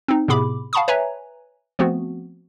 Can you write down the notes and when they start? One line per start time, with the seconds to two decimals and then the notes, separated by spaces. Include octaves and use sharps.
0.08 C4 D#4
0.28 A2 C3 B3 G#4 B5 D6
0.73 F5 F#5 A5 B5 C#6 D#6
0.88 B4 C#5 E5 G#5 A#5
1.79 F3 A3 B3 C4 F#4